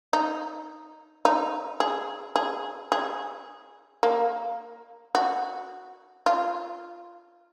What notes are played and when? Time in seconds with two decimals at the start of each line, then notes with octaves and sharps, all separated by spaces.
0.13 D#4
1.25 D#4
1.80 G#4
2.36 G#4
2.92 G#4
4.03 A#3
5.15 F#4
6.26 F4